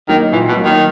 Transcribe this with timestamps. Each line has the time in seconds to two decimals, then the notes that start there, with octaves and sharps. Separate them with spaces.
0.09 D#3 F#3 A#3 D#4
0.32 A#2 E3
0.48 B2
0.57 F#3 A#3 D#4
0.65 D#3